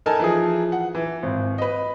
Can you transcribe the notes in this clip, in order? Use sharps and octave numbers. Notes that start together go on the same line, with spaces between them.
D#4 A4 A#4 G#5 A5
E3 F3 G#4
F#5
E3
G#1
B4 D#5